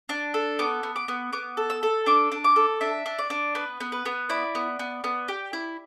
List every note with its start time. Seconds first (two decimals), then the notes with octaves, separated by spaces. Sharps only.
0.09 D4
0.34 A4
0.59 B3 D6
0.83 B3
0.96 D6
1.08 B3
1.33 B3 D6
1.57 A4
1.70 E6
1.83 A4
2.06 D4 D6
2.32 D4
2.44 D6
2.56 A4
2.81 D4 E5
3.06 D4
3.18 D5
3.30 D4
3.55 B3 B4
3.80 B3
3.92 B4
4.06 B3
4.30 E4 D5
4.55 B3
4.79 B3
5.04 B3
5.28 G4
5.53 E4